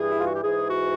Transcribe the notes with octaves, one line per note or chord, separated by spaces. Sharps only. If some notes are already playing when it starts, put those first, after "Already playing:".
Already playing: G2 E3 G#4
E4
F4
F#4
G4
G#2 E3 G#4
F#4